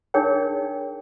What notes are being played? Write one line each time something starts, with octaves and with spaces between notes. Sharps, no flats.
D4 D#4 G#4 A#4 C#5 G5